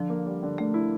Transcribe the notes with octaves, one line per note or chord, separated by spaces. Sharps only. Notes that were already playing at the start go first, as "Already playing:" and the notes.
Already playing: D3 F3
A#3
G3
D3
D3 A3
E4